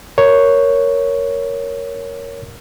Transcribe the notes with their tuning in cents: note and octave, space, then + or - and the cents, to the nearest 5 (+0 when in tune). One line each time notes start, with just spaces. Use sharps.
A#4 +0 C#5 +5